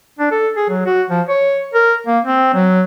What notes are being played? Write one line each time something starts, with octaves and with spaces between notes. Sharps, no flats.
D4
A4
G#4
F#3
F#4
F3
C#5
A#4
A#3
C4
F#3